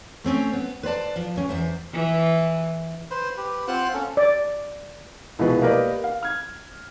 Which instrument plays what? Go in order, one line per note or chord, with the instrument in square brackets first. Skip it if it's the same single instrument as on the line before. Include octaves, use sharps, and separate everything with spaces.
[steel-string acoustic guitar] A3 C4 C#4 C#5
B3
B4 C5 D5 A5
F3
D#2 C#4
E2 C5 E5
[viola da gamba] E3
[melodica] B4 C5
G4 B4
C4 F4 C5 F#5
A#3 C#4 A4
[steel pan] D5
[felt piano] C2 B2 F3 G#3 F#4 B4
A#3 G4 A#4 B4 D5 D#5
F5
F6 G#6